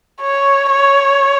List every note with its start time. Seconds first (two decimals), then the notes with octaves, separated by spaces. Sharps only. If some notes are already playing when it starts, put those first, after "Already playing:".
0.21 C#5
0.71 C#5